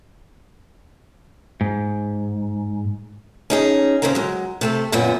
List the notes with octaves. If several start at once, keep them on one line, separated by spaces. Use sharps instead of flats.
G#2
C#4 D#4 G#4
C#3 C4 C#4 A#4 A#5
F#3 G#3
C3 A3 A4
F#2 A#2 D3 B3